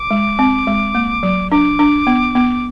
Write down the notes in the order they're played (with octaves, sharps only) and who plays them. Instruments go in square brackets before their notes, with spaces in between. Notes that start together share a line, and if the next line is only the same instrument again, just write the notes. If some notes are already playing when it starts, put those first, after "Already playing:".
Already playing: [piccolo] D6
[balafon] G#3
C4
G#3
A#3
F#3
[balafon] D4 [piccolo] D6
[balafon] D4
B3
B3